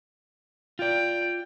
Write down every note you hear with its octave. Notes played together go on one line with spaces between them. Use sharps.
F4 D5 G5